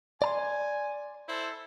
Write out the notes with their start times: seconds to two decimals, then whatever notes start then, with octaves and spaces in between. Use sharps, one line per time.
0.22 D5 G#5 A#5 C6
1.28 E4 A4 C5